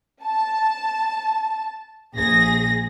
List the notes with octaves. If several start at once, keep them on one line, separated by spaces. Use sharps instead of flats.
A5
A#1 G#4 A#6